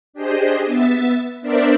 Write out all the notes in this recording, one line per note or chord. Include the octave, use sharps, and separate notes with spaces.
D4 G4 G#4 C5 D#5
B3 E5 A6
B3 D4 A#4 C5 D5 E5